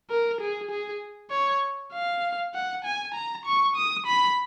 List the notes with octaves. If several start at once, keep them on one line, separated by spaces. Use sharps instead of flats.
A#4
G#4
G#4
C#5
F5
F#5
G#5
A#5
C#6
D#6
B5